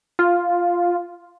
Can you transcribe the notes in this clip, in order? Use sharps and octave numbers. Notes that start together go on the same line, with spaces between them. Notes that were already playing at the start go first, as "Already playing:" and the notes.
F4